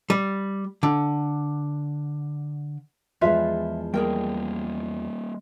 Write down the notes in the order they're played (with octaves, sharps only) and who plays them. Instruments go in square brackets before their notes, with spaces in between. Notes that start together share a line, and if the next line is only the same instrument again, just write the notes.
[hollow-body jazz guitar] G3
D3
[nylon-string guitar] E2 F3 G#3 [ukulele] F4 B4 E5
[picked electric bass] G3 A#3 [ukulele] G#4 A#4 G5